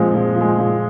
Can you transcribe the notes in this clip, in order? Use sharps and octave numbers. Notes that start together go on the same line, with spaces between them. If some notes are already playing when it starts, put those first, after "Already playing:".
Already playing: A#2 F3 G#3 C4
A#2
F3
G#3
A#2